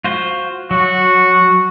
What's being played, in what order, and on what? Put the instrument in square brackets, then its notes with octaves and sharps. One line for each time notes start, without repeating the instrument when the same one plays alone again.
[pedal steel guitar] F4 F#4 C5
[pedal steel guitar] F#3 [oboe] F#4